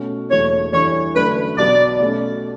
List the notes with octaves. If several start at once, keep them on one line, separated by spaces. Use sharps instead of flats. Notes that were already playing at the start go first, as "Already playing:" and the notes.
Already playing: B2 A3 C#4 F#4
F#1 E2 B2 A3 D4 C#5
G2 E3 G3 D4 A4 C#5
F#2 D3 A3 D4 B4
B1 B2 F#3 B3 D5
B2 A3 C#4